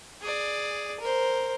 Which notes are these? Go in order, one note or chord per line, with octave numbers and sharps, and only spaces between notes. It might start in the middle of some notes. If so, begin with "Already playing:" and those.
G#4 D5
A#4 C5